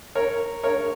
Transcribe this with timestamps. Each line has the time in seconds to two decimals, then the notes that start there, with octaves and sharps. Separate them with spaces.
0.15 A#4 C#5
0.63 A#4 C#5